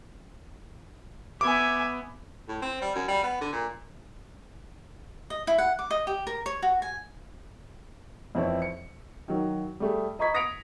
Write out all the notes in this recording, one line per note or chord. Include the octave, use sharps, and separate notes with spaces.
B3 E5 G#5 D6
A2
C4
G3
F#2
G3
B3
D3
A#2
D#5
E4
F#5
D6
D#5
G4
A#4
C#5
F#4
G#5
F2 E3 C4 E4 C#5
C#7
D#3 F#3
G3 A3 G#4
D#5 A#5 B5 C#6 G#6 B6
D#6 A#6 B6 C#7 D7 F7